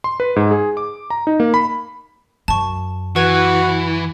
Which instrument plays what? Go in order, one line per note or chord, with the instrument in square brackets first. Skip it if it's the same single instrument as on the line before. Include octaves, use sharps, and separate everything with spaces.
[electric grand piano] C6
B4
G#2
G#4
D6
A#5
D#4
A#3
B5
[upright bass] F#2 [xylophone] A5 C#6
[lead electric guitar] E3 [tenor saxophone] F#4 [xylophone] B4 G#6